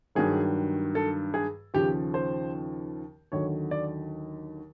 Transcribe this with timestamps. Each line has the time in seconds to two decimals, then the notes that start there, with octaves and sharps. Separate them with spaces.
0.15 G2 D#3 F#3 G#4
0.95 A4
1.34 G#4
1.74 D#2 C#3 F3 G4
2.14 C5
3.32 D#2 D3 F#3 C#5
3.71 D5